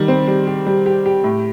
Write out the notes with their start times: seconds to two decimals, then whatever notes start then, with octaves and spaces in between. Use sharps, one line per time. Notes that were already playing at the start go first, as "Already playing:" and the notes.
Already playing: D#3 G3
0.08 C4
0.28 G3
0.47 G4
0.67 G3
0.86 G4
1.06 G4
1.24 A2